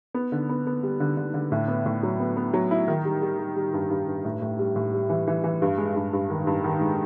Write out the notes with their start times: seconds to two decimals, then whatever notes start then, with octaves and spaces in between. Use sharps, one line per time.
0.14 B3
0.32 D3
0.49 B3
0.67 B3
0.83 G3
1.00 D3
1.17 D3
1.34 D3
1.52 A2
1.68 B3
1.86 A2
2.03 F#3
2.20 B3
2.37 B3
2.54 F#3
2.71 E4
2.88 D#3
3.05 G3
3.22 G3
3.39 G3
3.56 G3
3.73 G2
3.91 G2
4.08 G2
4.25 A2
4.42 A2
4.59 G3
4.76 A2
4.93 G3
5.10 E3
5.28 E3
5.44 E3
5.62 G2
5.78 G#3
5.96 G2
6.13 G2
6.30 D#3
6.47 G2
6.64 D#3
6.81 G#3